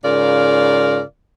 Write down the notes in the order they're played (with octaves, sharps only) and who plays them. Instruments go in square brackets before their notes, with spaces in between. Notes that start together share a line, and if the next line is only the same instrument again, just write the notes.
[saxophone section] G#2 C#3 F4 A#4 D5 F5